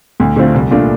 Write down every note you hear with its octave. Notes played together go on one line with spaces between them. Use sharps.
D2
D3 A3 C4 F4
C2
A#2 A3 D4 F4